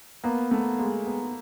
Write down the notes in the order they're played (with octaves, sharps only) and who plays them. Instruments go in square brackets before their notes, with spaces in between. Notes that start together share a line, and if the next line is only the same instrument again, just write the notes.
[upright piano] A#3 [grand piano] B3
[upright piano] A3 [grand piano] B3
[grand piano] G#3 [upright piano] A#3
[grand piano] B3